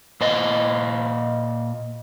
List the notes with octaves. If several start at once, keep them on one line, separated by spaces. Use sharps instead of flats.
A#2 C5 D#5